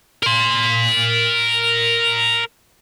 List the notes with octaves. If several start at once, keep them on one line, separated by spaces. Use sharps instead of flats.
A#4 C6